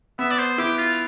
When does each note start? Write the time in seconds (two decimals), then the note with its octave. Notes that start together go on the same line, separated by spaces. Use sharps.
0.19 B3 E5
0.30 D5
0.39 C5
0.58 E4 G4
0.78 F4